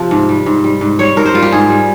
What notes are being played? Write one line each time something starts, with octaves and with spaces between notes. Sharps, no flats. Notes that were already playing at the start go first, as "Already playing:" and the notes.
Already playing: C3 F3
G#2
G3
G#2
G3
G#2
G3 C#5
G#2 A#4
C5
G3 F4
G4
G#2 G#4
G3